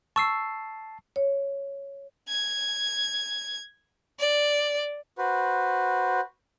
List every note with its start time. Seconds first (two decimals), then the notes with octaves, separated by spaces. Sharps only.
0.16 A5 C#6 E6 C7
1.16 C#5
2.29 G#6
4.19 D5
5.18 F#4 B4 C5